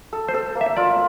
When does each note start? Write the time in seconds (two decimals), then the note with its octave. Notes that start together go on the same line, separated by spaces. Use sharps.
0.13 A4
0.29 C5
0.34 A4
0.55 A#3
0.61 E5
0.77 F4 D5